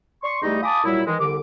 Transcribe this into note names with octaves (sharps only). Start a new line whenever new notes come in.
D5 C6 C#6
E2 G3 A3 D#4
F5 G#5 A5 B5 D6 D#6
A#2 F#3 G3 E4
D#3 E3 G#3
C2 D3 D6